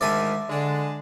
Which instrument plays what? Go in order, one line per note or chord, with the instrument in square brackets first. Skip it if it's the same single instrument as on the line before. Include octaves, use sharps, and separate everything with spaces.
[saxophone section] D2 G#2 D#3 [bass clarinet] G#3 [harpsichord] D5 E5 G#5
[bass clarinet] D3 [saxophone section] G#3 D4